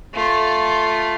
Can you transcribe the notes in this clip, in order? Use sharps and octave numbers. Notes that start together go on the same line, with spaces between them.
A3 F4